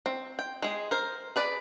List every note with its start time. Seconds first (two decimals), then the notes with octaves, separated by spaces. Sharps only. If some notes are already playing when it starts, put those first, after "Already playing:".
0.06 C4
0.39 G5
0.62 G#3 G#4
0.91 A#4 C5
1.36 G#4 B4 D5